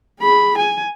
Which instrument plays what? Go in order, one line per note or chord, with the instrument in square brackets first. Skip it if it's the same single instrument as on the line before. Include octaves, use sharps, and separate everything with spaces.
[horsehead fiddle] G#4 B5
G#5